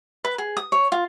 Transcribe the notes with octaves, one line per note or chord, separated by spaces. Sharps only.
B4
G#4
D#6
C#5
F4